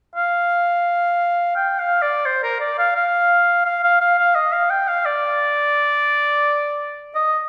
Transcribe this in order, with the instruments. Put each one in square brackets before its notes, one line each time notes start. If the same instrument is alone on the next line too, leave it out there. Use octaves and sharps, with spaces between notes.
[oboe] F5
G5
F5
D5
C5
A#4
D5
F5
F5
F5
F5
F5
F5
D#5
F5
G5
F5
D5
D#5